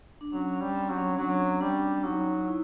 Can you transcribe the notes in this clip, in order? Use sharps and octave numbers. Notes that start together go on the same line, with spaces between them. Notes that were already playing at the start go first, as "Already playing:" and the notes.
D4
F#3 C#4
C#4
G3
C4
F#3
C#4
F#3 D4
G3 D4
F#3 D#4
E4